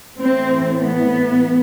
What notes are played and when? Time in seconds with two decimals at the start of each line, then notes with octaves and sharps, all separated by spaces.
0.18 A2 E3 C4
0.80 B3